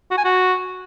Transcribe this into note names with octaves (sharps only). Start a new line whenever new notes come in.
F#4
G#5
F#4